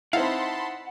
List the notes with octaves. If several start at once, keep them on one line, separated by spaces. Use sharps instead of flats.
C4 D#4 E4 F5 F#5 A5 B5 C6